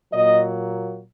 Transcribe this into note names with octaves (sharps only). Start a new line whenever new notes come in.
A#2 F#3 A#3 D#5